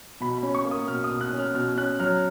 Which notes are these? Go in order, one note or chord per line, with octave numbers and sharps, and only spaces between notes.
B2 B5
C#4 B5
C#6
A#3
D#6
B2 F6
D#6
B2
F#6
C#4
F6
B2 F6
C#4 F#6
F#3 F6